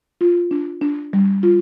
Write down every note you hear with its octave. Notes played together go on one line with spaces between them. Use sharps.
F4
D4
D4
G3
F4